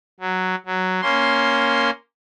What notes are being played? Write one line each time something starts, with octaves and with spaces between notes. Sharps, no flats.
F#3
F#3
A#3 C#4 C6